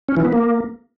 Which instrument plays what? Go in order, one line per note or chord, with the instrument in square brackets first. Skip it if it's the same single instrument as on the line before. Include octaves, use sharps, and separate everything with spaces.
[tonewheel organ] C#4
E3
B3
A#3